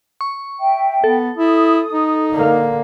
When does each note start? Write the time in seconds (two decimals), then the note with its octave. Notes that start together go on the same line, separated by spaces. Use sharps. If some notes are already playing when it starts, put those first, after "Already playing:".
0.21 C#6
0.60 E5 G5
1.04 B3 A4
1.38 E4 D#6
1.93 D#4
2.32 D3 A#3